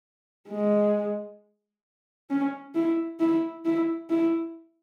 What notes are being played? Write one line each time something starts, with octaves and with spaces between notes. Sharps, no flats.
G#3
C#4
E4
E4
E4
E4